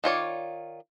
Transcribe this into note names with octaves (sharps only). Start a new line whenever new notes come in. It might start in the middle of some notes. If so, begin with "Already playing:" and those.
D#3 F4 C#5 D5